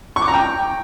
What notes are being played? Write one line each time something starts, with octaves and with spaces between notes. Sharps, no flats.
C#6
D6
A#5
G5